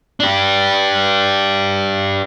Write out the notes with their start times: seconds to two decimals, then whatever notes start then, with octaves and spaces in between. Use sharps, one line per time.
0.20 D4 G4